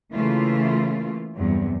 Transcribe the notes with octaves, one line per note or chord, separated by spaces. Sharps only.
C#3 E3 A3 A#3 E4 F4
E2 G2 C3 F#3